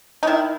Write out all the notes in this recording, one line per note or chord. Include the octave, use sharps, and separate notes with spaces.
D#4
D#3 E4